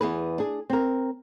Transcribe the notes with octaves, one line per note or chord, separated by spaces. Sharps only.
E2 G#4 B4
D4 G#4
C4 A#4